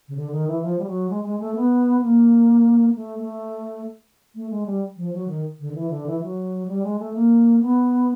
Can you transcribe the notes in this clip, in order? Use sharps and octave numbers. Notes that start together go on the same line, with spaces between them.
C#3
D3
D#3
E3
F3
G3
F#3
G#3
G#3
A3
B3
A#3
A3
A3
A3
G#3
G3
F3
F#3
D#3
D3
D#3
E3
D3
E3
F#3
G3
G#3
A3
A#3
B3